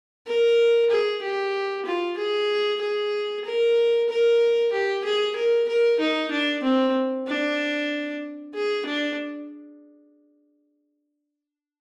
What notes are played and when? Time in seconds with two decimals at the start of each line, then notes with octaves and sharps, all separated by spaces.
0.27 A#4
0.90 G#4
1.22 G4
1.86 F4
2.18 G#4
2.81 G#4
3.45 A#4
4.09 A#4
4.72 G4
5.04 G#4
5.36 A#4
5.68 A#4
6.00 D#4
6.31 D4
6.63 C4
7.27 D4
8.54 G#4
8.86 D4